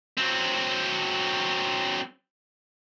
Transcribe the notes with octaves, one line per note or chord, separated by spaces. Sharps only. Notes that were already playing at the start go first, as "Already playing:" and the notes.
F#3 C4